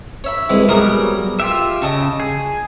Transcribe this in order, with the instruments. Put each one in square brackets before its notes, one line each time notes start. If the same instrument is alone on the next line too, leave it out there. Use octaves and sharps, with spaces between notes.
[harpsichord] C#5 E5 B5
C2 E3 G#3
[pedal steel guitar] F#3 G3 B3 [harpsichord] G#4 A#4
[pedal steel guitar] F4 G4 E5
[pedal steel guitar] C#3 [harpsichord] D#5 A5 C#6
[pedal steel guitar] G#4